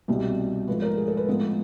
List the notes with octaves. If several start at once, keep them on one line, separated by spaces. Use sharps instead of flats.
C2 B2 G3
G#2 F3 A3 B4
A#4
G#4
A4
B4
A2 F3 G#3 B3